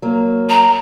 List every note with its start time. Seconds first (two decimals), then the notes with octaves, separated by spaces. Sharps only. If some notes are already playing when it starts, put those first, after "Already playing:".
0.02 F#3 A#3
0.49 A#5